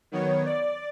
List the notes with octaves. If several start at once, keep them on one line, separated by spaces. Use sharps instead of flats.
D#3 F#3 B3 C#5
D5